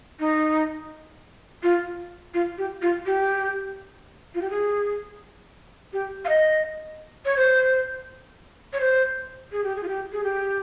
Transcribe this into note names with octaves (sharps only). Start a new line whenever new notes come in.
D#4
F4
F4
G4
F4
G4
F4
G4
G#4
G4
F5
D#5
C#5
C5
C#5
C5
G#4
G4
G#4
F4
G4
G#4
G4